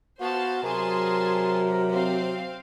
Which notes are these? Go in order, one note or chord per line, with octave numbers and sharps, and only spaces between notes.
B3 F#4 C5 F5 A5
C3 F#3 G#4 A#4 A5 C6
C4 F5